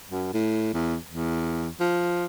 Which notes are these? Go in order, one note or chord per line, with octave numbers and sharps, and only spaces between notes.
F#2
A2
E2
E2
F3